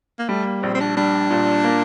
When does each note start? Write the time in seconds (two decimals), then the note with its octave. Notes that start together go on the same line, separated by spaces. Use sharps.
0.19 A#3
0.29 G3 A3
0.45 A#3
0.63 A#1 C4
0.75 C4
0.80 D4
0.97 G3 D4
1.30 A#2
1.64 A#3